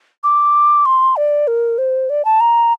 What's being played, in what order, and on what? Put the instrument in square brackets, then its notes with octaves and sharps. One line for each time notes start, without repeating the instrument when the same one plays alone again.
[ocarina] D6
C6
D5
A#4
C5
D5
A5
A#5